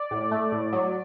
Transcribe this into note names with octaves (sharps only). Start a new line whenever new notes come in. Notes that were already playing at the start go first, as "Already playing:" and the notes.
Already playing: D5
A2
A3
A2
F#3